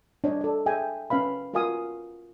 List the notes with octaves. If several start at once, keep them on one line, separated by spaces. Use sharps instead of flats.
D4 C#5 D#5
A4 D5
G#4 E5 G5 G#5
C#4 B4 F5 B5
F4 F#4 A#4 F5 G#5 D#6